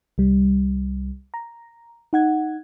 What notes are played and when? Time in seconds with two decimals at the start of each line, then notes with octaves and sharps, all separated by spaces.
0.18 C2 G3
1.34 A#5
2.13 D#4 F#5 G#6